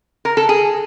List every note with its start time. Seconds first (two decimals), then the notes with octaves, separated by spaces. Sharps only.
0.25 A#4
0.37 A4
0.49 G#4